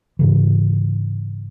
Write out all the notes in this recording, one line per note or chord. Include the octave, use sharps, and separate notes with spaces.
G#2 C#3 E3